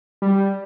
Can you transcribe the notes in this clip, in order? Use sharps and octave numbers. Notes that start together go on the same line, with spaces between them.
G3